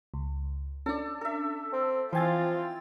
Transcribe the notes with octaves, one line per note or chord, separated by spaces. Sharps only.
C#2
C#4 D4 A4 D5
A4 E5
C4
E3 F3 C4 F4 G5 G#5 C6 A6